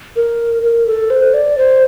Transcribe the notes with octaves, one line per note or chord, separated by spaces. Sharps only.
A#4
A#4
A4
C5
D5
C5